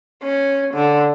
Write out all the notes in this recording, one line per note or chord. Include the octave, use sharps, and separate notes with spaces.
C#4
D3